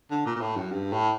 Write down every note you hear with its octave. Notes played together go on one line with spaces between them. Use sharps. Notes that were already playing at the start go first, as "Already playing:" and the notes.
D3
A#2
A#2
A2
F#2
G2
A2